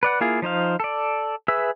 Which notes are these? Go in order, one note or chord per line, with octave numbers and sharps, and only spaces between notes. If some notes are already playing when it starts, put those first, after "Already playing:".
B4 D5 F#5
A#3 E4 F4 G#4
F3 D#4 C5 F5
A4 D5
G#4 B4 E5 E6